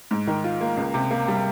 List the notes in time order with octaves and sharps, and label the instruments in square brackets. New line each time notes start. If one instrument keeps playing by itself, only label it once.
[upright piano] G#2
D#3
F4
A#3
C#2
C3
A#3
G3